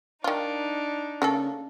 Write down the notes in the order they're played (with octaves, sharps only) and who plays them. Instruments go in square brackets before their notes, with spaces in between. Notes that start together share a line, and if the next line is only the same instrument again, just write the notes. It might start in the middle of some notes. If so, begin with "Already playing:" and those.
[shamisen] D#3 F4 [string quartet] D4 D#4
[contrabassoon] C#3 [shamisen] A3 A#3 A4